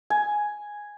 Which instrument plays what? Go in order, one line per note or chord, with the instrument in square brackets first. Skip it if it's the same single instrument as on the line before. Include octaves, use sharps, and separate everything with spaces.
[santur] G#5